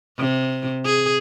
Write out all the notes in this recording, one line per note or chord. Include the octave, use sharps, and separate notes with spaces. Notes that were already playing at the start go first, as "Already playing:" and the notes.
C3
G#4